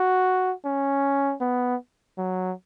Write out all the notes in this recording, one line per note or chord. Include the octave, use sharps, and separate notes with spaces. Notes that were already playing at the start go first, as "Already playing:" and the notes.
Already playing: F#4
C#4
B3
F#3